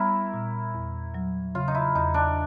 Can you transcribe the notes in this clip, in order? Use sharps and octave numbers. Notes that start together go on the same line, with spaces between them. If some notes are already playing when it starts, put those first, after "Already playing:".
Already playing: G3 B3 E4 A#4 C#5
A#2
E2
F#3
C#3 F4
D#4
E4
E2 D#4
D4